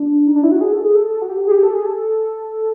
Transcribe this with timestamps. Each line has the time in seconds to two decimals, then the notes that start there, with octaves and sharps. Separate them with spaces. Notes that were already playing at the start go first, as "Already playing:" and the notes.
Already playing: D4
0.27 D#4
0.35 D4
0.43 E4
0.52 F#4
0.61 G#4
0.72 A4
0.84 G#4
0.95 A4
1.22 F#4
1.29 G4
1.47 G#4
1.51 G4
1.63 A4
1.74 G#4
1.86 A4